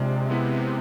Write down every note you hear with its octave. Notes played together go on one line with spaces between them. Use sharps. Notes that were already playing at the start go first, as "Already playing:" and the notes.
Already playing: C3 G#3 D4 F4 D5
G#3 B3 E4 B4